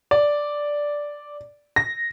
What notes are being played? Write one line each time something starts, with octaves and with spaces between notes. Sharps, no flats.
D5
A#6